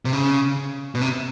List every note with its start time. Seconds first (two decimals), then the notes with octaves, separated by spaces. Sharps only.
0.05 C3
0.13 C#3
0.95 B2
1.01 C3